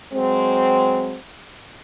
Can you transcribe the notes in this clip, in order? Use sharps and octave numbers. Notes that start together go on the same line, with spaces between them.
F#3 G#3 C4